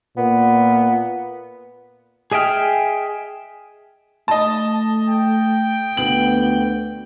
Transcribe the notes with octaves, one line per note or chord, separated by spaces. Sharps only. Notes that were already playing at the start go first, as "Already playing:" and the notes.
A#2 B3
G#4 D#5 E5 G5 F6
A3 D#5 A5
G5
D2 B3 F#7